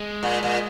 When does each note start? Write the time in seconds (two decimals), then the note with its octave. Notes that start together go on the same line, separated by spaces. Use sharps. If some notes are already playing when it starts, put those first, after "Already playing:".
Already playing: G#3
0.23 A#2
0.43 A#2